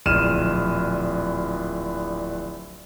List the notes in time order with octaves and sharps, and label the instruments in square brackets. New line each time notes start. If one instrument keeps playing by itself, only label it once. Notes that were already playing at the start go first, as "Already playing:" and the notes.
[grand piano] D1 A#1 F6 D#7 E7